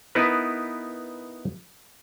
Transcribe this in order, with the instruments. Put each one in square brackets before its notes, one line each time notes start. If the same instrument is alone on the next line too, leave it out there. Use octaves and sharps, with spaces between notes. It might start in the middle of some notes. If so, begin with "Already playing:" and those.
[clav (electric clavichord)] B3 D#4 E4 A#4 B4